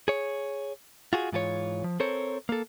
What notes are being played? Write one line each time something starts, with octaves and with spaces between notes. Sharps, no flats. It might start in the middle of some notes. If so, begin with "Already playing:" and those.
G#4 C#5
F4 F#4 G#4
G#2 E3 F4 G#4 C#5
F3
C4 A4 A#4 C5 C#5
A#3 A4